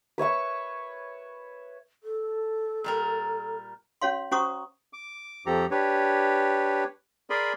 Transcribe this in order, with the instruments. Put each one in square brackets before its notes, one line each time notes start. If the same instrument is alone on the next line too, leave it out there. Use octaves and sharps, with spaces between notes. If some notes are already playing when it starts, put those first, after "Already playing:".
[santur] B4 C#5 E5 C#6
[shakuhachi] A4
[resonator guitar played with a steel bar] A#2 G3 A#4
[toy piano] C#4 F#4 C#5 F5 C6
C#4 F#4 C5 A#5 C#6 D#6
[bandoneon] D6
F2 F3 G4 A4 A#5
D4 G4 B4 C#5
G#4 A#4 D5 G#5 B5 C6